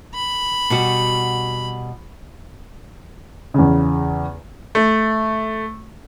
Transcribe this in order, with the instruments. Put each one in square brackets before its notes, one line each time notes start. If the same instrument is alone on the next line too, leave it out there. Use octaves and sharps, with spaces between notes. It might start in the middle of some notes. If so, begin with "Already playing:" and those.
[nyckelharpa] B5
[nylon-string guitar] B2 G3 F#4
[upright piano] E2 C#3
[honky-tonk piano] A3